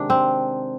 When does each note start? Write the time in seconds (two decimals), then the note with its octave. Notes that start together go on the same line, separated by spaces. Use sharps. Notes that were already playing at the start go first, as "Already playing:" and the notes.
Already playing: C3 D#3 G#3 D4
0.10 C4